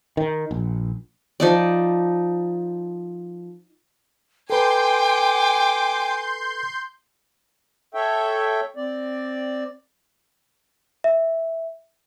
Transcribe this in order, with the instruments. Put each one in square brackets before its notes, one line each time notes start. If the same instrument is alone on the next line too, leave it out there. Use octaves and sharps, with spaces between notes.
[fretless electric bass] D#3
A#1
[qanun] F3 D#4 D5
[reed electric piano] A4 B4 [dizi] G5 [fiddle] G#5 D6 [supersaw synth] C6 G6
[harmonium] A4 C#5 E5 G5
C4 D5
[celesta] E5